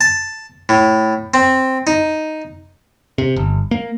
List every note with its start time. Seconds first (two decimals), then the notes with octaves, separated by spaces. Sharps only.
0.01 A5
0.69 A2
1.34 C4
1.87 D#4
3.18 C3
3.36 G1
3.71 A#3